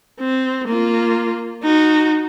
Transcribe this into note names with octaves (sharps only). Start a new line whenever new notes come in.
C4
A#3 F4
D#4 F#4